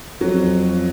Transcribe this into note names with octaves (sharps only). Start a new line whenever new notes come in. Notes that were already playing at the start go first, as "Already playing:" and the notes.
F2 F#3